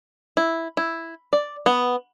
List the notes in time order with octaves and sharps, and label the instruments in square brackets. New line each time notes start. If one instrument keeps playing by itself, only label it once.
[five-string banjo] E4
E4
D5
B3